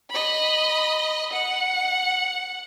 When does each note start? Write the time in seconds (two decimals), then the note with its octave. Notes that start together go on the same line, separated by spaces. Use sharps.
0.10 D#5 B5
1.33 F#5